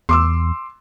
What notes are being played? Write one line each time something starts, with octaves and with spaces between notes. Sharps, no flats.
E2 C6 D6 E6